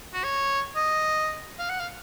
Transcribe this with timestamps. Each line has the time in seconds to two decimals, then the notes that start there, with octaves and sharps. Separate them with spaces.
0.14 F#4
0.24 C#5
0.76 D#5
1.59 F5
1.70 F#5
1.80 F5